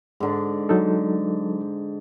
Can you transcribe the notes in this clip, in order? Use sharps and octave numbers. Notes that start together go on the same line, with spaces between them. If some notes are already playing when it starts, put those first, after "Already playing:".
G#2 D3
F#3 D#4 A4